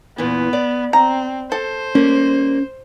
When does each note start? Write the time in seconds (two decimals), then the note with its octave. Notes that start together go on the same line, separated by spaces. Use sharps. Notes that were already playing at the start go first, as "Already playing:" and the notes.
0.18 E2 A#2 E3 B3
0.53 D5
0.93 C4 A#5
1.52 A4 C5
1.95 G3 A#3 C#4